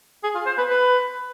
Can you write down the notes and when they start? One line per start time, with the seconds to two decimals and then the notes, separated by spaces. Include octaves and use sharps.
0.24 G#4
0.35 F4
0.46 C5
0.58 B4
0.69 B4